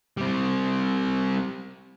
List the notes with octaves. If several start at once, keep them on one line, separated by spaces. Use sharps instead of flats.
G3 C4